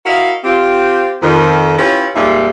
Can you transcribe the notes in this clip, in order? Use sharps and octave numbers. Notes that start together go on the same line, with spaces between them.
E4 F#4 A#4 D#5 F5
C4 F4 G4
F2 D#3
C#4 E4 F4 G4 B4 C#5
F2 A#2 G3 G#3 D#4 E5